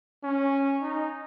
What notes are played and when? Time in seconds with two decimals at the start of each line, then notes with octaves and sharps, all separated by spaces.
0.23 C#4
0.82 D#4